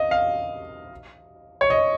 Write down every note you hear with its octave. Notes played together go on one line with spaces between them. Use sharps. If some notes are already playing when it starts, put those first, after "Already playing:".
Already playing: D#5 F5
F5
C#5
D#5